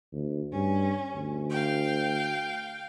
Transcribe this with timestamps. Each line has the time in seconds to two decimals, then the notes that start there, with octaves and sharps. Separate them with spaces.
0.12 D2
0.53 G2 C#4
1.15 D2
1.50 F5 G5